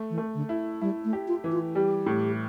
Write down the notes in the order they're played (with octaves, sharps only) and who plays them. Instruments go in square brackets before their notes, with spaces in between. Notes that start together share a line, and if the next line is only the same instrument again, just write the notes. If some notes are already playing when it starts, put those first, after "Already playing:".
Already playing: [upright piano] A3
[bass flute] E3
[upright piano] A3
[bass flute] D3
[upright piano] E4
[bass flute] G3 [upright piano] E4
[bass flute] A3
[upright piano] G4
[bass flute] F4
[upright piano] E3
[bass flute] F4
[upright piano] G3 [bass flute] G4
[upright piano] A2